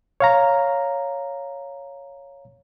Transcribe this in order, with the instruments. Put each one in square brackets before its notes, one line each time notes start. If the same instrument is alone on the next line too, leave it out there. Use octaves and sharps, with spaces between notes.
[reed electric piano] C#5 F5 A#5